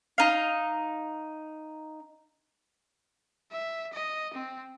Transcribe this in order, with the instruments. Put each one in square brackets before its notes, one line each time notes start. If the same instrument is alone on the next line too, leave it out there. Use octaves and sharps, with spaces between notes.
[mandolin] D#4 F5
[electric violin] E5
D#5
C4